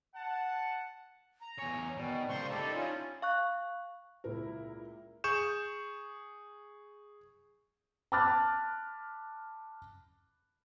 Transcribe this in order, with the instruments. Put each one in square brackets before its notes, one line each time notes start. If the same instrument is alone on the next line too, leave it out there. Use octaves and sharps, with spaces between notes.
[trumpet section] F#5 A5
[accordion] A#5
[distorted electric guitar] E2 C#5 [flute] G#5
[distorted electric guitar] B2 [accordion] D#3 [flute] D5
[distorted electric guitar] C#2 A#4 [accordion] C5 C6 C#6
[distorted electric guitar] D#4 E4 [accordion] G4 A4 [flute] D5
[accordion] C#4 F4 [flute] C#5
[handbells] F5 C#6 F#6
[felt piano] C#2 A#2 A#4 [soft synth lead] E4
[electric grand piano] G#4 C#6 G6 E7
[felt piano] A5 B5 D6 F6 F#6 A6